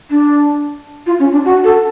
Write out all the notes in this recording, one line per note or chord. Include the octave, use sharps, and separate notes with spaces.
D4
F4
C#4
D4
F#4
A4